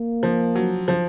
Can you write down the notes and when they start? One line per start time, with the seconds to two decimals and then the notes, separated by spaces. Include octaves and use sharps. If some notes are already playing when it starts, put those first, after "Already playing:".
Already playing: A#3
0.23 F3
0.55 F#3
0.88 F3